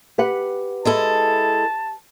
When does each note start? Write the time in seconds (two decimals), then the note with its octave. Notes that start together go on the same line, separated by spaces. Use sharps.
0.18 G4 B4 F#5
0.85 G#3 E4 A4 A5